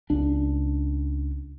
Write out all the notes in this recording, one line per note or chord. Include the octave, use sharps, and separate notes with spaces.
C#2 D4